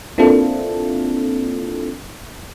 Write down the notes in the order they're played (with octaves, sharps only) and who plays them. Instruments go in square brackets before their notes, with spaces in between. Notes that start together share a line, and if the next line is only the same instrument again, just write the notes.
[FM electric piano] A#3 C4 D4 E4 F4 A4